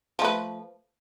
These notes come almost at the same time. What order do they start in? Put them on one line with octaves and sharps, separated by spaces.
F3 A3 B4